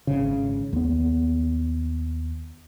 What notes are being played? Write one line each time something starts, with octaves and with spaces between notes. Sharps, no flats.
G#1 C#3
D#2 B3